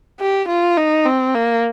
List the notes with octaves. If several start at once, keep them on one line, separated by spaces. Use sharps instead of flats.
G4
F4
D#4
C4
A#3